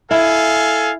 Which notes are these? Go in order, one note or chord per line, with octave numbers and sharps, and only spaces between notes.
E4 A4 F5 G#5